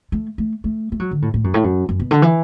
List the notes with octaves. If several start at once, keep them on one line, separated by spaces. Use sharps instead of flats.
A3
A3
A3
A3
F#3
D3
A2
A2
F#2
A2
F#2
F#2
B2
D3
E3